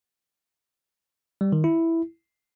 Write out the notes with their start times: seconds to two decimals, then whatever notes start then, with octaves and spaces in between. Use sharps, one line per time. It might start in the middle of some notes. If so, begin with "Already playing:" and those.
1.41 G3
1.52 D#3
1.64 E4